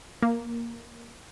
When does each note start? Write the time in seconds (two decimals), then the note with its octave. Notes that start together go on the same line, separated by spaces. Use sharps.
0.22 A#3